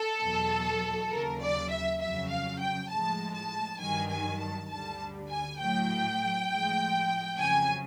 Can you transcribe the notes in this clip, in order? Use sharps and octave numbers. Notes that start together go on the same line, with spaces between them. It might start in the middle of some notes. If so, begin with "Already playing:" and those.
Already playing: A4
E2 B2 F#3
D#2 C#3 F#3 A#4
D5
E5
F2 C#3 F#3 E5
F5
G5
A2 F3 G#3 A5
A5
G2 D#3 F#3 G#5
G#5
A5
D2 D3 G3 A5
G#5
A2 F#3 G5
A2 F3 G#3
F2 C#3 F#3 G#5